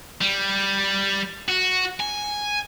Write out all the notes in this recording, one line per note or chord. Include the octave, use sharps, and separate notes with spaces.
G3
F#4
G#5